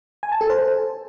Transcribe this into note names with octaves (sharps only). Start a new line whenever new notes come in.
G#5
A5
A4
C5